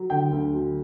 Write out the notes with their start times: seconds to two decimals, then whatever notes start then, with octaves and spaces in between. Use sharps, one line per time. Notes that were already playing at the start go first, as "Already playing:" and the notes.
Already playing: F#3
0.10 D3 G5
0.31 D2
0.52 F#3